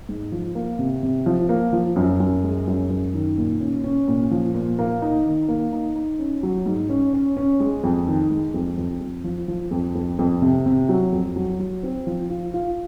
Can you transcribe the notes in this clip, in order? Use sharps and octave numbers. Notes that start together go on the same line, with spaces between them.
G#2
F3
A#3
C3
C3
F3
A#3
F3
F#2
F#2
G#3
F#2
F#2
D#3
A#2
C#4
C#4
A#2
F3
A#2
A#3
D#4
D#3
A#3
D#4
D#4
C#4
F#3
G#2
C#4
C#4
C#4
G#3
F2
D#3
G#3
F2
F2
F2
F3
F3
F2
F2
F2
C3
C3
F#3
F2
F#3
F#3
C4
F3
F4
F4